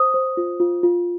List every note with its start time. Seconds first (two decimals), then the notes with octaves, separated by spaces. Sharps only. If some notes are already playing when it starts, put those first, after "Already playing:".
Already playing: C5 D#6
0.14 C5
0.37 F4
0.60 F4
0.83 F4